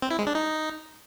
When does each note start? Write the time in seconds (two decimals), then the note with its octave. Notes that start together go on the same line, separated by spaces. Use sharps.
0.02 C4
0.11 E4
0.19 G#3
0.27 D4
0.35 D#4